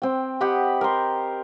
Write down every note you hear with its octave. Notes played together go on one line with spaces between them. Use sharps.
C4 G5
G4 D#5 F#5 B5
A#4 C6